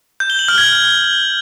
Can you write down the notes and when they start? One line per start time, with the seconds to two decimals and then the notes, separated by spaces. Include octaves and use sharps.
0.20 G6
0.30 G7
0.39 F#7
0.48 F6
0.58 G#6